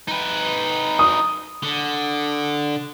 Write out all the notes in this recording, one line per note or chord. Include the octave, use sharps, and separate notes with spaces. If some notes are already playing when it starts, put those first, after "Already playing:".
D#4 B4
D#6
D3